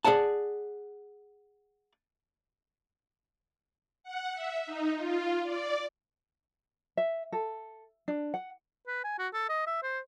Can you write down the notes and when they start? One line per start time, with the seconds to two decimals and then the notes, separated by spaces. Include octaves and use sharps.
0.05 G#4 A#4 D5 F#5 A5
4.04 F#5
4.34 E5
4.66 D#4
4.96 F4
5.43 D5
6.97 E5
7.32 A4
8.08 D4
8.34 F#5
8.87 B4
9.04 G#5
9.19 F#4
9.33 A4
9.49 D#5
9.67 E5
9.83 C5